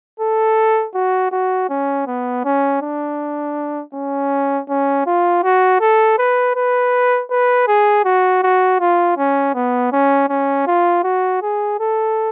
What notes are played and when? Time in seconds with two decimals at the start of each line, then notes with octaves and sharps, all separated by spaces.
0.20 A4
0.94 F#4
1.31 F#4
1.69 C#4
2.07 B3
2.45 C#4
2.82 D4
3.94 C#4
4.69 C#4
5.06 F4
5.43 F#4
5.81 A4
6.18 B4
6.56 B4
7.31 B4
7.67 G#4
8.05 F#4
8.43 F#4
8.80 F4
9.18 C#4
9.55 B3
9.92 C#4
10.29 C#4
10.67 F4
11.04 F#4
11.42 G#4
11.80 A4